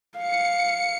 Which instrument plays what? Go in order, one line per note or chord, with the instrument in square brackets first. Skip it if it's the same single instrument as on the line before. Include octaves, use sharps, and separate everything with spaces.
[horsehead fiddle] F5 [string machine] C#7